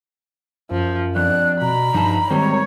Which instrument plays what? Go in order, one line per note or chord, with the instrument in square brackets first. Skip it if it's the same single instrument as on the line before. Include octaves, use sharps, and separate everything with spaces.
[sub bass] F#2 [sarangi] F3
[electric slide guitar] F2 [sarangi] D4 [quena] F#6
[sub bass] B2 [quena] A#5 [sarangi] B5
[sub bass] G2 [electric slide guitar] F3 D#4 A5
[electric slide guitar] G#2 G3 C4 [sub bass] D#3 [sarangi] C#5